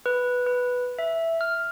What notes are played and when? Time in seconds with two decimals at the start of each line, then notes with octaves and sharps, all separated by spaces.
0.06 B4
0.47 B4
0.99 E5
1.41 F6